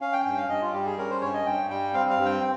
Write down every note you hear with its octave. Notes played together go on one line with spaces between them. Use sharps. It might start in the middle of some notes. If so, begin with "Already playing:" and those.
C#4 F5
G5
G2 G5
F5
G2 D#5
F4
G3 G4
G#4
C#4 A#4
C5
G2 C#5
D#5
G2 G5
G3 G5
C4 F5
F5
G2
G5